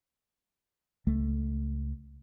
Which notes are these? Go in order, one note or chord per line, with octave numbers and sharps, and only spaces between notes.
C#2 A3